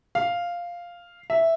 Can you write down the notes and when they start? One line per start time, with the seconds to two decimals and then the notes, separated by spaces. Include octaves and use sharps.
0.15 F5
1.30 E5